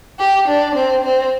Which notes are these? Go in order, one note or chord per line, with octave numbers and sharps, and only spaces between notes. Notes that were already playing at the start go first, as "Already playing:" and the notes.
G4
D4
C4
C4